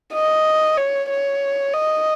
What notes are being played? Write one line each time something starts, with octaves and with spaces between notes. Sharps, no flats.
D#5
C#5
C#5
D#5